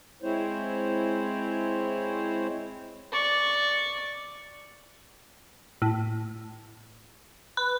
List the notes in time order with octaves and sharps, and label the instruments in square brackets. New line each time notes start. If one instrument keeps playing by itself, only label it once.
[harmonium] G#3 C4 E4 C5 C#5
[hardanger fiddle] D5 C#6
[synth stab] A2
B4